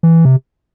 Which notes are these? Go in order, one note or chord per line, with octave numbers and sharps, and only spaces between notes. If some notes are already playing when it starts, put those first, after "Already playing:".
E3
C3